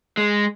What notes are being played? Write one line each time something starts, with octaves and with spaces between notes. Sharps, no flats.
G#3